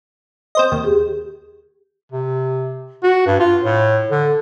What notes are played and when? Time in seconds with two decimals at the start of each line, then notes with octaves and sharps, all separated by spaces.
0.55 C4 C5 D#5
0.72 D#2
0.84 G4 G#4
2.12 C3
3.03 F#4
3.26 G2
3.39 F4
3.62 A2
4.10 D3